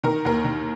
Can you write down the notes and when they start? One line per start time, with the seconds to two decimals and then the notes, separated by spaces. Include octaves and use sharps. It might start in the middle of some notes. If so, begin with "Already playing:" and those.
0.04 D#3 A#4
0.25 D#2 A#4
0.44 D#3